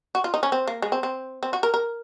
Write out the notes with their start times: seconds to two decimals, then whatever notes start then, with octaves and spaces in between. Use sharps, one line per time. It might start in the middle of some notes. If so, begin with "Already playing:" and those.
0.15 F#4
0.24 F4
0.34 D#4
0.43 C#4
0.52 C4
0.68 A#3
0.82 G#3
0.92 C4
1.03 C4
1.43 C4
1.53 F#4
1.63 A#4
1.74 A#4